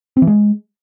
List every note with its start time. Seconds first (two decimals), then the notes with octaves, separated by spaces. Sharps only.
0.17 C4
0.22 E3
0.27 G#3